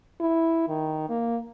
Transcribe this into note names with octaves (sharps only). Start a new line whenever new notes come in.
E4
D#3
A#3